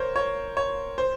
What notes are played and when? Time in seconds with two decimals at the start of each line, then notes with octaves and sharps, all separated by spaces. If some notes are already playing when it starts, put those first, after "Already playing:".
Already playing: A#4 C5 C#5
0.16 C#5
0.57 C#5
0.98 C5